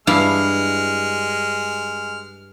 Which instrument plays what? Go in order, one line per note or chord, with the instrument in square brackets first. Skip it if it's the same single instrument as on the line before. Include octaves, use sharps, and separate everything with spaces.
[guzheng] G2 E4 F5 [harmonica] G#3 F6